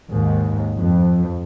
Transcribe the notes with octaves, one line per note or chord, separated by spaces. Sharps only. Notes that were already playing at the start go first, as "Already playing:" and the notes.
D#2 G#2
F2